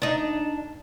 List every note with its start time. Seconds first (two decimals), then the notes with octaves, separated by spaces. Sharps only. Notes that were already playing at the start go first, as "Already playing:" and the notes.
0.02 D4 D#4